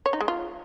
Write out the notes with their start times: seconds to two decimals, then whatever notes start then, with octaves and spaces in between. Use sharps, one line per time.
0.06 C#5
0.13 D#4
0.21 G#3
0.28 F4